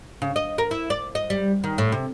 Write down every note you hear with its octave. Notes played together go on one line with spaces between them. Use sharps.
C#3
D#5
A#4
E4
D5
D#5
G3
D#3
A2
C3